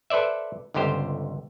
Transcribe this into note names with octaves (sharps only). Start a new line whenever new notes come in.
A4 B4 C5 D5 E5
G1 C#2 D3 G4 C5